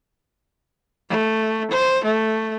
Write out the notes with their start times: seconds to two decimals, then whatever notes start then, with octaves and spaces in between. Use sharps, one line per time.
1.10 A3
1.71 C5
2.04 A3